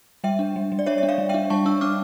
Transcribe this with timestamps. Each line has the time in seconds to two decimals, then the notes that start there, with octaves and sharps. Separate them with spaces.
0.24 G3 E5 G5
0.39 D4
0.56 G3
0.72 G3
0.79 D5
0.86 D4 C#5 E5
0.98 E5
1.03 D4
1.09 D5 F5
1.18 G3
1.29 E5 G5
1.34 D4
1.50 G3 A5 C#6
1.66 D4 C#6 E6
1.81 D4 D6 F6